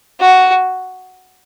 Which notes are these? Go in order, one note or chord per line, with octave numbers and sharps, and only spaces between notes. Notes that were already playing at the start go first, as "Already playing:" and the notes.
F#4